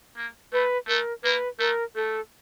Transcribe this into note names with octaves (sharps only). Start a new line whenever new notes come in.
A#3
A3 B4
A3 A#4
A#3 B4
A3 A#4
A3 A4